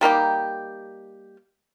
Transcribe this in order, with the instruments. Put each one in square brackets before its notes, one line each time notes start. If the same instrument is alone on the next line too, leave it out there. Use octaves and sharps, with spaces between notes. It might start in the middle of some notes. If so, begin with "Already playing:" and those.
[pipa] G3 A#3 D#4 G4